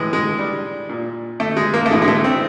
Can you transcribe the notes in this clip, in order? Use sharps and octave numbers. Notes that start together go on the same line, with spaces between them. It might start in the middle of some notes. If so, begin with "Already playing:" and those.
Already playing: A2 E3 G#3
G#3
G3
A#2
A3
G#3
A#3
A3
A2 E3 G#3
G#3
A3
C4